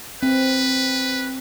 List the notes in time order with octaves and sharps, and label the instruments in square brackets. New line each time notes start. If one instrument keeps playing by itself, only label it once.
[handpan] C4 [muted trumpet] B4